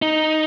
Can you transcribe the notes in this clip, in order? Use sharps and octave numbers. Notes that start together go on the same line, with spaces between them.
D#4